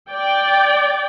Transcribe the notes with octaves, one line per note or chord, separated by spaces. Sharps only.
D5 G5